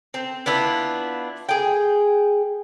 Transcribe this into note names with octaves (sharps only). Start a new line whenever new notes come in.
C4
B3 D4 E4 F4
G#4 G5